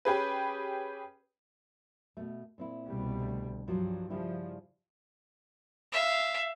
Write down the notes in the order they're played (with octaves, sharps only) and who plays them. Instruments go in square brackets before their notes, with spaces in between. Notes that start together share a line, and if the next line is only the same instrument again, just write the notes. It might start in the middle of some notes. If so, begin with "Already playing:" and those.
[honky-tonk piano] C#4 G4 G#4 B4
[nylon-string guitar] B2 A3
A#2 C4 E4
[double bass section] C2 B2 G3
[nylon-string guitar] D2
[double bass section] G2 [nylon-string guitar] F3 F#3 F4
[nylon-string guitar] C#3 G3 E4 [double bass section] F3
[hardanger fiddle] E5 F5